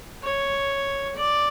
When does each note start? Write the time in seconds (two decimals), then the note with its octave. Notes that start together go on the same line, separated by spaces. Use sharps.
0.23 C#5
1.16 D5